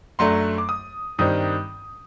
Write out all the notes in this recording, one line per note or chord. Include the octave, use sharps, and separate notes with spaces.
F#2 F#3 A3 D4 C6
D6
D#6
G2 D#3 G3 C4 D#6